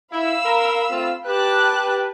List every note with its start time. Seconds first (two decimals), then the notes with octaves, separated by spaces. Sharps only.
0.13 E4 F5 B5 E6
0.45 A#4
0.90 A3 C4 F4
1.27 G4 B4 G5 A5 F#6